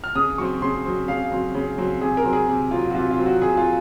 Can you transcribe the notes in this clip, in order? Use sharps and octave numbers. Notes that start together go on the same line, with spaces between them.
F6
C#3 D#6
F#3 C4 C#6
C#3 C6
F#3 C4
C#3 F5
F#3 C4
C#3
F#3 C4
C3 G#4
A#4
F#3 C4
G#4
C3
F#3 C4 F4
F#4
C3 F4
F4
F#3 C4
F#4
C3 G#4
F4